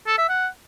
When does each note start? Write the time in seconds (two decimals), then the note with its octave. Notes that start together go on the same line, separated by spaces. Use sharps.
0.07 A4
0.18 E5
0.29 F#5